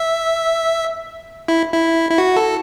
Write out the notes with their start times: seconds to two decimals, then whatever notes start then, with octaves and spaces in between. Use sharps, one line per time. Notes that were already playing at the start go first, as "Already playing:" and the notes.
Already playing: E5
1.48 E4
1.74 E4
2.11 E4
2.18 F#4
2.36 A4